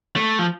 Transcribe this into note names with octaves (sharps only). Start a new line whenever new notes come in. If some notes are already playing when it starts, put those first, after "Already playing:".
A3
F3